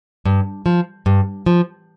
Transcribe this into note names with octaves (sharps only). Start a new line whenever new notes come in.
G2
F3
G2
F3